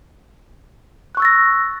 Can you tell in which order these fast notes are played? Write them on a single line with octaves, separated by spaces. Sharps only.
F#6 C#6 E6 A6 A#6